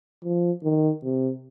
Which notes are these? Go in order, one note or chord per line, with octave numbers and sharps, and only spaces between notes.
F3
D#3
C3